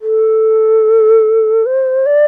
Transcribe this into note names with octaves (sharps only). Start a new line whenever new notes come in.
A4
C5
D5